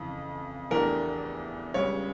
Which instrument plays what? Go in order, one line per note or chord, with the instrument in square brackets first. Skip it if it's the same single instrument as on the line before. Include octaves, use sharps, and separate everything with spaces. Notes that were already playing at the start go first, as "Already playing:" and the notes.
Already playing: [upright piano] F2 C#3 E3
[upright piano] E2 E3 A3 D4 G4 [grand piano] A#4
[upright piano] C#2 C#3 G3 [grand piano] C#5